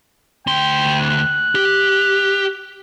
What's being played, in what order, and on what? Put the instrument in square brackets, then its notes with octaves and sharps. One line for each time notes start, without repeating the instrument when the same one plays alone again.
[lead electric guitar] D2 C6 [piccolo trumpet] G5
[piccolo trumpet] F#6
[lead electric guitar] G4